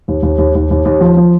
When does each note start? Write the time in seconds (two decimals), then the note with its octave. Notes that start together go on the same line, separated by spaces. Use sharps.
0.08 D#2
0.23 D#2
0.38 D#2
0.55 D#2
0.71 D#2
0.85 D#2
1.01 F3
1.17 F3